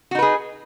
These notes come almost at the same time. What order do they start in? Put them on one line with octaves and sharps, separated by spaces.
F#4 D#4 B4 G#4